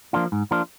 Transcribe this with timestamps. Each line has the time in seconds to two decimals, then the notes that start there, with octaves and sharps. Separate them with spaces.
0.13 F3 A#3 D4 F4
0.32 G#2
0.51 F3 A#3 D4 F4